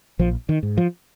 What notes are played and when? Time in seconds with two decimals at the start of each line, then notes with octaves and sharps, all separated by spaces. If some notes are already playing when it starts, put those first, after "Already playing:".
0.19 A#1 F3
0.49 D#3
0.63 G#2
0.78 F3